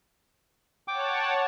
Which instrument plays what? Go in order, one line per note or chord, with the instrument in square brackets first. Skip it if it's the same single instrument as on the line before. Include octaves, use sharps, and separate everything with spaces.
[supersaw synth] C#5 F#5 A5 [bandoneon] G5 D6